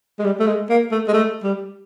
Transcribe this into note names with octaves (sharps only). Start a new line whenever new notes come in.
G#3
G3
A3
G#3
A#3
A3
G#3
A3
G3